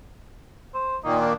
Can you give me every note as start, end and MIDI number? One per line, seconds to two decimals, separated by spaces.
0.74 0.97 72
1.04 1.33 46
1.04 1.33 51
1.04 1.33 58
1.04 1.17 63
1.21 1.35 62